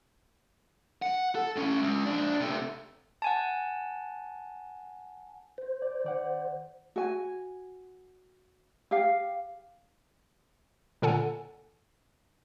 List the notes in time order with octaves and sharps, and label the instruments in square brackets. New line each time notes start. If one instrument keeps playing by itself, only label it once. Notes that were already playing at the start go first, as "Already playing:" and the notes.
[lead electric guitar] F#5
A4
A2 C#4
G#3 C#4
F2 D4
C3 A3
[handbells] F#5 G#5 A5
[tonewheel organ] C5
[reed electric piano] D5
D#3 D5 F#5
[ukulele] F#4 G#5
G4 F5
[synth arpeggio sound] A#2 D3 A4 F#5 G#5